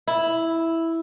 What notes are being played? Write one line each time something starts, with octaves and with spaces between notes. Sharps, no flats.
E4